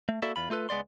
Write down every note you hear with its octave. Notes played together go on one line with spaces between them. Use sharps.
A3
A#3 E4 F#4 A4 D5 E5
E2 F4 B5
A3 F4 A4 B4
C#2 G#3 B3 D5 C6